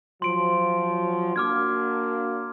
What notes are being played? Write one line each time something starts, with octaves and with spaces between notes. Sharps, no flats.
F3 F#3 C6 D7
A#3 D4 F#4 D6 F6 G#6